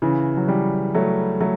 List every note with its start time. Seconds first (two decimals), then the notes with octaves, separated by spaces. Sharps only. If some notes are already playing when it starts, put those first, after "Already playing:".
0.02 C#3 E3
0.37 F#3
0.48 E3 G3
0.94 F#3 A3
1.41 F#3 A3